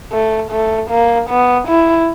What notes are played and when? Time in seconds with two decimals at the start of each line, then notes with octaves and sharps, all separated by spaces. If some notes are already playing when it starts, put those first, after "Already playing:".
0.12 A3
0.51 A3
0.91 A#3
1.30 B3
1.68 E4